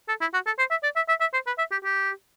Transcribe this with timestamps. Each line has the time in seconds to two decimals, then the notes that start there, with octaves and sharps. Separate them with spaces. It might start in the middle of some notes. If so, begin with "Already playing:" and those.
0.08 A4
0.21 E4
0.34 F#4
0.46 A4
0.59 C5
0.71 E5
0.83 D5
0.96 E5
1.09 E5
1.21 E5
1.33 C5
1.47 B4
1.58 E5
1.72 G4
1.84 G4